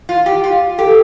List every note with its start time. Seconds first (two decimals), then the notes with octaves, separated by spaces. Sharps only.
0.09 F4
0.26 G4
0.44 F4
0.79 G4 A4